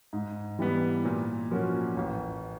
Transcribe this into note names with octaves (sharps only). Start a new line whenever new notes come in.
G#2
E3 G3 B3
A#2
F3 A#3 C#4 F#4
A1